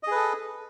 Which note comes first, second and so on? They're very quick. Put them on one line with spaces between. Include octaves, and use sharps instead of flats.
D#5 G#4 B4 A4